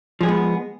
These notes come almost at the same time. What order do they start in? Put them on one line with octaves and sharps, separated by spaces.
F3 G#4 G#3 B3